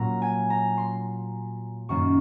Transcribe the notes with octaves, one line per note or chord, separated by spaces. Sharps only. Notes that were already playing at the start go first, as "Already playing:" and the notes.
Already playing: A#2 F#3 A#3 A#5
G#5
A#5
C6
F#2 D#3 A#3 C#6